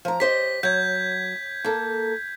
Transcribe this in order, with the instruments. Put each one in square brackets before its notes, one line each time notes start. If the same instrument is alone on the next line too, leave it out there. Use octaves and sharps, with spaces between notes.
[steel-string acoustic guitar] F3 A#5
[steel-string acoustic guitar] G4 C5 D#5 [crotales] B6
[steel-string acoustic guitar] F#3 [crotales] G6 G#6
[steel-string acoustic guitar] A#3 A4